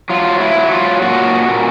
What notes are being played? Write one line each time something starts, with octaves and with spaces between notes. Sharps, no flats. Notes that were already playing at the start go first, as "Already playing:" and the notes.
F#3 F4
E4
F#3
F4
A#2 F#4
A#2